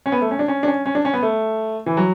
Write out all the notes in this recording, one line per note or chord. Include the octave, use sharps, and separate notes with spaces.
C#4
B3
A3
C#4
D4
C#4
D4
C#4
C#4
D4
C#4
B3
A3
E3
F#3